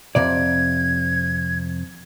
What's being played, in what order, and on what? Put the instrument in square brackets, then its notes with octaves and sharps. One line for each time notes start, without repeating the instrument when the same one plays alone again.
[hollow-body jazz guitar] F2 C3 D5 [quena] G#6